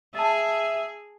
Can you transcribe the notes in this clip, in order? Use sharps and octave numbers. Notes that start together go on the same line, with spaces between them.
G#4 D#5 E5 A5